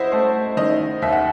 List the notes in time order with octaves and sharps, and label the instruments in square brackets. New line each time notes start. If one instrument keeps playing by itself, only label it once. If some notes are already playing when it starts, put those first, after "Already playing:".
Already playing: [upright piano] E4 C5 D#5 F#5
A3 C5
D#3 D#5
D#2 E5
F#5